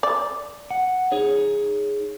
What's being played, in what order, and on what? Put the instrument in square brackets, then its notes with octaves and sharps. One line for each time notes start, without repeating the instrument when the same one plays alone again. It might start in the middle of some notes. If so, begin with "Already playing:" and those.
[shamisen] D5
[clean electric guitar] F#5
D#4 G#4 C#5